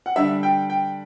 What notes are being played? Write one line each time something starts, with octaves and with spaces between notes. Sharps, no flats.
F#5
D3 G3 D4 E5
G5
G5